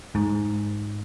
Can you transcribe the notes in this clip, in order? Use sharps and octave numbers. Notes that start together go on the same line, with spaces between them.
G#2